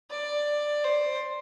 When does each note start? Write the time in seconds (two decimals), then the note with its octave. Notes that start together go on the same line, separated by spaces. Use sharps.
0.11 D5
0.85 C5